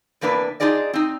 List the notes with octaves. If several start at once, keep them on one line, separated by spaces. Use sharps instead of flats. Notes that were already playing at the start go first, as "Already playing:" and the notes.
E2 C3 A#3 D4 B4
D4 D#4 F4 G#4 D5 D#5
C4 D#4